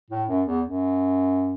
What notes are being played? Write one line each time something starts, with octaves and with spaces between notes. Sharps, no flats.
A2
F#2
E2
F#2